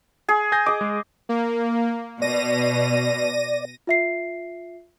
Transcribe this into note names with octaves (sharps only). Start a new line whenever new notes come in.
G#4
G#5 G6 A#6
G#4 D#5 D6
G#3
A#3
B2 D5 A#6 D#7
F4 E5 C7